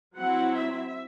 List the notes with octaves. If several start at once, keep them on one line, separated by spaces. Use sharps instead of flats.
F#3 C4 E4 F#5
E5